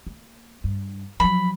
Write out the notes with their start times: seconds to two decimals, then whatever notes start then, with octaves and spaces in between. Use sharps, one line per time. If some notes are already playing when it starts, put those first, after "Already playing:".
0.07 A#3
0.64 G2
1.20 F3 F#3 B5